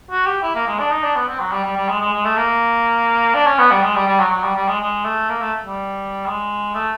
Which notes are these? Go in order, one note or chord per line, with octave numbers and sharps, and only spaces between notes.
F#4
G4
E4
A#3
G#3
D4
D#4
D4
B3
C4
F#3
G3
G3
G3
G#3
G#3
G#3
A3
A#3
D4
C#4
B3
G3
G#3
G3
G3
F#3
F#3
G3
G3
G#3
G#3
A3
A#3
A3
G3
G#3
A3